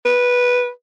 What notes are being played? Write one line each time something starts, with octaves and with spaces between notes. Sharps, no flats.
B4